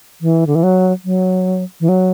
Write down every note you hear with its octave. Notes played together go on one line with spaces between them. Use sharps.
E3
D3
E3
F#3
F#3
E3
F#3